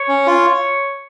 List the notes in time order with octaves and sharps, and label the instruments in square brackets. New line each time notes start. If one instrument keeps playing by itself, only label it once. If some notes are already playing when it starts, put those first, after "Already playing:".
Already playing: [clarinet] C#5
[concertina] C#4
F4